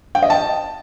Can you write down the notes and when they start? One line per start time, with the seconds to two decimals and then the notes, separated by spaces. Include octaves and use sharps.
0.15 G5
0.22 D#5
0.30 A5